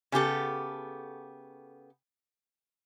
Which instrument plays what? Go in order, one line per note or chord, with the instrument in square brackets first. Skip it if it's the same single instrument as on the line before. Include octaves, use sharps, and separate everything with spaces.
[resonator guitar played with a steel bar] C#3 B3 G4 A4